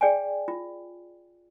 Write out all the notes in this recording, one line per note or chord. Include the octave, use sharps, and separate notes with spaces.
G#4 D5 G5 G#5
F4